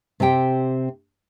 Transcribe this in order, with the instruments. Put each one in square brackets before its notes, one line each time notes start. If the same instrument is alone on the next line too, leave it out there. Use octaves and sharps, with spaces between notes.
[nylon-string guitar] C3 C4 G4 G5